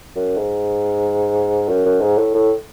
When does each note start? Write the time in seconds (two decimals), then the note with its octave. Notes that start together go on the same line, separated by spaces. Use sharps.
0.15 F#2
0.37 G#2
1.69 F#2
1.85 F#2
2.01 G#2
2.18 A2
2.34 A2